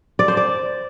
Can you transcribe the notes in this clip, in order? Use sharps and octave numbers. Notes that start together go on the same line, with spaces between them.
D5
C5
D5